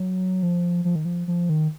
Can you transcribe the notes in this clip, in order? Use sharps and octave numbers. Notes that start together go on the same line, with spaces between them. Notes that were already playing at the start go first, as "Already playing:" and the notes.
Already playing: F#3
F3
F3
D#3
F3
F3
D#3